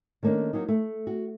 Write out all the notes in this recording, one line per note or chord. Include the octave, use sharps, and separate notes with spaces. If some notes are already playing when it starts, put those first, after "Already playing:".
D#3 A3 A#3 C#4 D4
F#3 A#3 D#4
A3
F#4